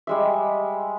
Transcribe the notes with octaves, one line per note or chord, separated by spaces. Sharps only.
G3 G#3 E5